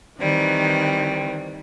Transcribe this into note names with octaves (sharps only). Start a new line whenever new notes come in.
D#3 E3 G3 C4